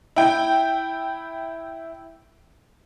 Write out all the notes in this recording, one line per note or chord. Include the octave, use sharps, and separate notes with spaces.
E4 G5